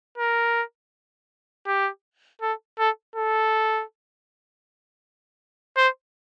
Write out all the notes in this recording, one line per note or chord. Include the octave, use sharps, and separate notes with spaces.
A#4
G4
A4
A4
A4
C5